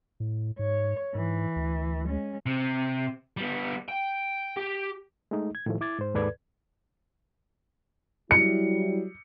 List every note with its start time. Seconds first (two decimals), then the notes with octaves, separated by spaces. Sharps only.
0.20 A2
0.59 G#2 C#5
1.15 G#2 E3
1.56 D2
2.06 G#3 C#4
2.46 C3
3.37 G3 B3
3.88 G5
4.57 G4
5.31 G#3 A3 D#4
5.55 G#6
5.66 A2 D#3 F3 A3
5.81 E4 D6 G#6 A6
5.99 G#2 C5
6.14 D#2 G#2 A4 B4 D5 G#6
8.31 F#3 G3 E4 C#7